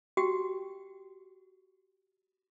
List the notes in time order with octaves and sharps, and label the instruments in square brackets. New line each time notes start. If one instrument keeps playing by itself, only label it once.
[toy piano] F#4 G4 G5